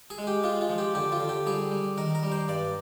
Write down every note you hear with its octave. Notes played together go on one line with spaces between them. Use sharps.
G#4
G#3
G4
G#3 F4
F4
F3
G4
D3 G4
F4
D3
G4
G3 G#4
G3
D#3 A#4
A#4
G3
C5
G2 D5